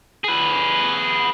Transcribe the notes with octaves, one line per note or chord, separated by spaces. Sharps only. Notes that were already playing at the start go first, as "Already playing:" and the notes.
G#4 B4